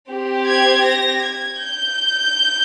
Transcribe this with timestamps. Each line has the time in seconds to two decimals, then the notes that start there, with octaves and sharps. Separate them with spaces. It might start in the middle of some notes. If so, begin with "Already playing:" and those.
0.11 C4 G4
0.49 G#6
0.86 A#6
1.24 G#6
1.62 G6